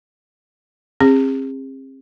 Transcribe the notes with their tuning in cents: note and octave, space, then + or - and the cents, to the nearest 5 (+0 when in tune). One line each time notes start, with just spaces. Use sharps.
C4 +35 G#4 -40